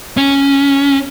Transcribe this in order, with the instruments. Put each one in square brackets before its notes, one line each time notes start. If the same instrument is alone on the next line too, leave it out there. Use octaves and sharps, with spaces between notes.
[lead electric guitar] C#4